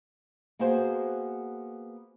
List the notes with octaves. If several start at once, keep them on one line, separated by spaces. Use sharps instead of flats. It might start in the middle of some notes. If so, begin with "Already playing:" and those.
A#3 B3 F#4 G#4 C5